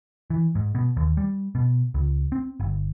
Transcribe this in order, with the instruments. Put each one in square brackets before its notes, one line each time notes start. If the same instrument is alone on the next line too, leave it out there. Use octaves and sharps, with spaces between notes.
[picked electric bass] E3
G#2
B2
D#2
G3
B2
C#2
C4
G1